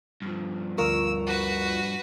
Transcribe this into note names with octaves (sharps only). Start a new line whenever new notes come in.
G2 F3
D2 F4 A#4 C#6 E6
F#4 B4